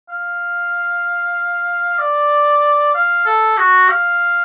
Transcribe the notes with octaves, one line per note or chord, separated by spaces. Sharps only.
F5
D5
F5
A4
F#4
F5